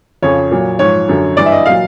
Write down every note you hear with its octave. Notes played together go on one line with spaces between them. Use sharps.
F2 C#3 F3 C#5
A#2 F#3
G#2 F3 C#5
F#2 D3 F#3
G2 E3 D5
E5
D#5
A#2 F#3 F5